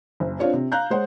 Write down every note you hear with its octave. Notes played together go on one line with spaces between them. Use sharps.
F#1
C4 D4 F4 C#5 D5
C3
F5 A#5 F#6 G6
G#3 C5 C#5 F#5